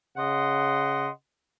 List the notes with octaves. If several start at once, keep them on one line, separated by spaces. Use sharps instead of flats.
C#3 D#5 F#5 C6